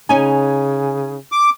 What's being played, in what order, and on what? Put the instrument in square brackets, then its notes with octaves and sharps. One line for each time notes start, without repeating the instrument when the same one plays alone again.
[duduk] C#3 [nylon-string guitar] C#4 D#4 [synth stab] G#5
[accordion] D6